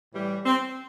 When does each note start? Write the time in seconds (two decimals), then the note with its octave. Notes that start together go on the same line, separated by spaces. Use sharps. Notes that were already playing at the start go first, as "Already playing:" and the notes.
0.13 A2 E3 G3
0.45 C4